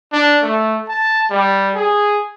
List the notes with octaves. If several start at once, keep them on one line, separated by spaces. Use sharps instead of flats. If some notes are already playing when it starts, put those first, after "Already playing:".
D4
A3
A5
G3
G#4